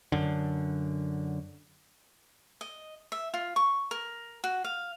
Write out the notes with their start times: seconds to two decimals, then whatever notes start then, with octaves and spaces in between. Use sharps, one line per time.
0.12 F#2 D3
2.61 D#5
3.12 E5
3.34 F4
3.56 C#6
3.91 A#4
4.44 F#4
4.64 F5